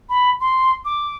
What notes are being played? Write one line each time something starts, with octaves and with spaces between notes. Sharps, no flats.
B5
C6
D6